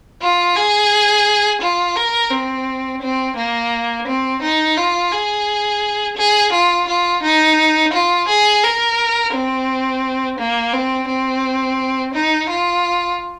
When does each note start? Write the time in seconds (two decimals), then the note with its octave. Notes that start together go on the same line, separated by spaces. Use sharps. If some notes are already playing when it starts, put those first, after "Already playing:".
0.22 F4
0.56 G#4
1.62 F4
1.97 A#4
2.32 C4
3.02 C4
3.37 A#3
4.07 C4
4.43 D#4
4.77 F4
5.12 G#4
6.17 G#4
6.53 F4
6.88 F4
7.23 D#4
7.94 F4
8.28 G#4
8.63 A#4
9.34 C4
10.39 A#3
10.73 C4
11.08 C4
12.14 D#4
12.49 F4